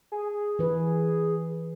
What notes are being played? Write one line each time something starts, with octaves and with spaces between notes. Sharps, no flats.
G#4
E3 B4